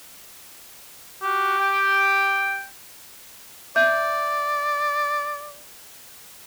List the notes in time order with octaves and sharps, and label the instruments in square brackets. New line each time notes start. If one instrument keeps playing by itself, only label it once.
[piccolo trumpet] F#4 [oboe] G4
[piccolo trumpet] G5
[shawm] D5 [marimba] E5 G6